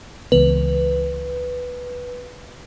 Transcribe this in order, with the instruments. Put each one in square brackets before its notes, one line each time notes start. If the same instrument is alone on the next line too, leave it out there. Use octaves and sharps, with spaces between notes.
[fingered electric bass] C#2 E3 B3 [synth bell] B4